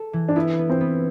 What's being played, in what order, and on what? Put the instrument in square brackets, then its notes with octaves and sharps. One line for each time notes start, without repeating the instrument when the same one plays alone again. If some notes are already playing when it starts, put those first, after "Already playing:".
Already playing: [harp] A4
E3
[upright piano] D4
[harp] B3 [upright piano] E4
[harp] B3
[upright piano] C4
[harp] B3